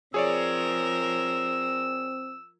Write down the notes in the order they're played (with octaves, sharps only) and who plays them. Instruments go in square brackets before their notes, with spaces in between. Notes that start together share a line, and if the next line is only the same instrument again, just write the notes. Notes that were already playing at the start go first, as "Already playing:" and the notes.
[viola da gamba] F3 A#4 [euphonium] C4 [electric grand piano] G#4 C#5 D5 [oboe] E6